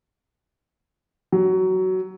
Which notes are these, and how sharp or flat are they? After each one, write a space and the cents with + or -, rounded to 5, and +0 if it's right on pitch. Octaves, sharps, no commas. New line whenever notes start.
F#3 +15